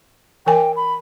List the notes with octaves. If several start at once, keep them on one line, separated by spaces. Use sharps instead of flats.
E3 A#4 G5 G#5
B5